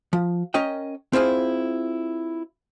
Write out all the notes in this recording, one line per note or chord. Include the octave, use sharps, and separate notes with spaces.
F3
C#4 A#4 D#5 G5
C4 E4 F4 G#4